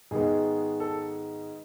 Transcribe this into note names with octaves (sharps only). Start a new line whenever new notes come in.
G#2 D#3 G#3 B3 G#4
A4